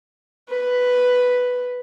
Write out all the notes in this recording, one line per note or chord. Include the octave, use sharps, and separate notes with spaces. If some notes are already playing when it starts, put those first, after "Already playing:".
B4